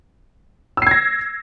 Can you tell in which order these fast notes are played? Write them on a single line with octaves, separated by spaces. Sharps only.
E6 C7 G#6 A#6